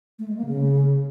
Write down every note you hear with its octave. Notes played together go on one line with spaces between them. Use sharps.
A3
G#3
A#3
C#3